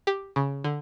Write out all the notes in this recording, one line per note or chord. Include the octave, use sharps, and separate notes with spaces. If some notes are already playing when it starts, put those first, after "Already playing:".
G4
C#3
D3